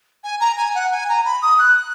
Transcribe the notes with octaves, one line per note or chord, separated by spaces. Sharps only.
G#5
A#5
G#5
F#5
G#5
A#5
B5
D#6
F#6